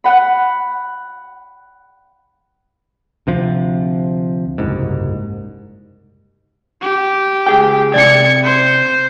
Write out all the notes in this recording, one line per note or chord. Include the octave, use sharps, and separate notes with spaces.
F#5 B5
D2 C3 F3
F#1 C2 G#2
G4
C#2 G#4 G5
C3 D5 G#6 C#7
C5 G6